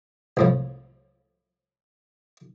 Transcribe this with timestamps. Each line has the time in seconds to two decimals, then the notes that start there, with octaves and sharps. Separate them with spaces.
0.37 C2 A2 F3